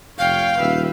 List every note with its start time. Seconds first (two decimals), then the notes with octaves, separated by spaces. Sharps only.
0.18 F1 C#5 F5 G5
0.58 D#1 B4 E5